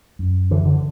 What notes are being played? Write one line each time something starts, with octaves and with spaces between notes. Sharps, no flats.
F#2
D3 E3
D3